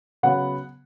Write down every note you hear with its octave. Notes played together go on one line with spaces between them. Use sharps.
C#3 F#3 B3 F#5